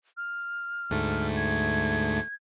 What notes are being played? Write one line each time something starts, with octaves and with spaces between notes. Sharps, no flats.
F6
D2 G#2 A3
G#6